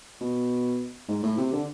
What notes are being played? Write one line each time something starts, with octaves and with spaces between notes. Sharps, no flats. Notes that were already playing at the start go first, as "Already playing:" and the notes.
B2
G#2
A2
C3
D3